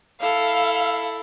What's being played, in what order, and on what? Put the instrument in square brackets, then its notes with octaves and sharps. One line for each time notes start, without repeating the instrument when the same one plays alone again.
[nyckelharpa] E4 A4 [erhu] F5